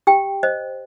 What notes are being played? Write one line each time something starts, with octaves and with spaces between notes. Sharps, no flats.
G4 G5
C5 D#5